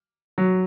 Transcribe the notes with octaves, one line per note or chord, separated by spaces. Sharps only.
F#3